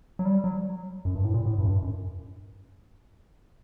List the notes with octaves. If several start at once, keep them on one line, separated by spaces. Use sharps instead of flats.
F#3
G3
F#3
F#2
G2
A2
A#2
A2
G2
F#2
G2
F#2